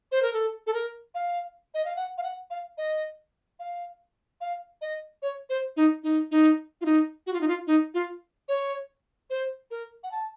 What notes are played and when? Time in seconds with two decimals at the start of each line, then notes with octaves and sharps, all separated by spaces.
0.12 C5
0.23 A#4
0.33 A4
0.67 A4
0.74 A#4
1.15 F5
1.74 D#5
1.85 F5
1.96 F#5
2.18 F5
2.23 F#5
2.50 F5
2.78 D#5
3.59 F5
4.41 F5
4.81 D#5
5.22 C#5
5.49 C5
5.77 D#4
6.03 D#4
6.31 D#4
6.81 F4
6.85 D#4
7.27 F#4
7.33 F4
7.41 D#4
7.48 F4
7.67 D#4
7.94 F4
8.49 C#5
9.30 C5
9.71 A#4
10.04 F#5
10.12 A5